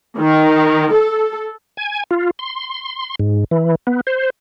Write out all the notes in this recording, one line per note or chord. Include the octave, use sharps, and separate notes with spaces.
D#3
A4
G#5
F4
C6
G#2
E3
B3
C5